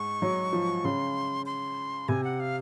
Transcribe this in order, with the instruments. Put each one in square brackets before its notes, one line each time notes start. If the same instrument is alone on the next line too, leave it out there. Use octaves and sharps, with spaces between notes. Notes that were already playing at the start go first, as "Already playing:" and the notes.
Already playing: [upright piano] G#2 [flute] C#6
[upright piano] F#3
F3
[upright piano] C#3 [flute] C6
[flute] C6
[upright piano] C3 [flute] G#5
[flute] F#5
F5